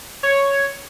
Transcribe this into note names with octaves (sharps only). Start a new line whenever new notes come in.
C#5